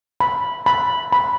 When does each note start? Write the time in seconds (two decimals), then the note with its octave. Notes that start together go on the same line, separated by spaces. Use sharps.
0.20 B5
0.66 B5
1.12 B5